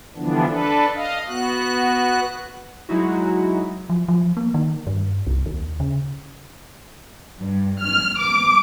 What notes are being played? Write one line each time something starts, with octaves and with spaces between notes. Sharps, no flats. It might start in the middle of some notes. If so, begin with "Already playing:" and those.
D3 E3 F3 G3 B3 D4
D4 A4 B4
D#5 F5
B3 F#4 F#6
F#3 G#3 D#4 E4 F#4
F3
F3
A#3
D#3
G2
C2
D#2
C#3
G2
F6
D6